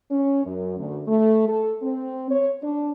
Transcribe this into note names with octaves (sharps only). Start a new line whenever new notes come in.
C#4
F#2
D2
A3
A4
C4
C#5
D4